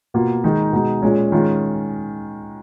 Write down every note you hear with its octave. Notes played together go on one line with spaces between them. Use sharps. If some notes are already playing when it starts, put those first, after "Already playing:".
B2 A#3 F4
D#3 G#3 D#4
B2 G#3 D#4
A#2 G#3 C#4
D#3 G#3 C#4 F4